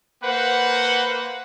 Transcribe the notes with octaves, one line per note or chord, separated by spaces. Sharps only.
A#3 B4 C5 F#5